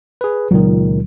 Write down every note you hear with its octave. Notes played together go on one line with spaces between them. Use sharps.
G#4 B4
C#2 A#2 D#3 F#3